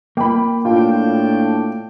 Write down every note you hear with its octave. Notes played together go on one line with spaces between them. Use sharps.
A#3 G5 B5
A2 D4 F4 G5